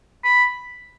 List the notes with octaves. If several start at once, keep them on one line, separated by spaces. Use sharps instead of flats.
B5